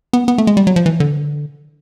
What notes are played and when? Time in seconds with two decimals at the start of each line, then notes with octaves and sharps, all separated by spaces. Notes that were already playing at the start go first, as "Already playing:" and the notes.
0.13 B3
0.28 B3
0.38 A3
0.47 G#3
0.57 G3
0.67 F#3
0.76 F3
0.86 E3
1.00 D3